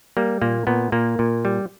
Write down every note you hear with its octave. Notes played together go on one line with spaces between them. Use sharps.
G3 A#3
A#2 A#3
A#2 B3
A#2 A#3
A#2
G3